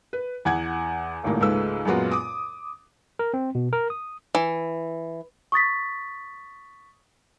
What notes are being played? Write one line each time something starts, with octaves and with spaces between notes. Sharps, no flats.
B4
E2 F#5 G#6
D#1 G#1 C#2 A2 A#3
C#2 G#2 G#3 A3 B4 E6
F#2 A#2 G#3 B3 F4 F#4
D6 D#6
A#4
C4
B2
A#4
D#6
E3
C#6 D#6 A6 B6